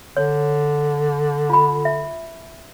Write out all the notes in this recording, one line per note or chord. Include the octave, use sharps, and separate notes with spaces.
D3 C#5
F4 B5
E5